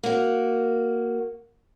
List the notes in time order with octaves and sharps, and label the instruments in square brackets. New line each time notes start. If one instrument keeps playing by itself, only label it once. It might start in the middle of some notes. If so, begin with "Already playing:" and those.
[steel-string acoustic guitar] A#3 F#4